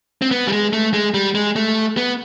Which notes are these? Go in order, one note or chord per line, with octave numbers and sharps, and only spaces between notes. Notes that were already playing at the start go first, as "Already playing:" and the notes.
C4
B3
G3
G#3
A3
G#3
G3
G#3
A3
B3